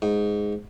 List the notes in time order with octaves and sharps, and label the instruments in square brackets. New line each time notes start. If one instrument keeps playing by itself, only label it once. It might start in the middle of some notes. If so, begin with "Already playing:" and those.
[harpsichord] G#2